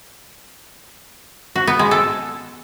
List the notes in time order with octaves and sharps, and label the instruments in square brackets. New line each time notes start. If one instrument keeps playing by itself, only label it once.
[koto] F#4
B3
G#3
A4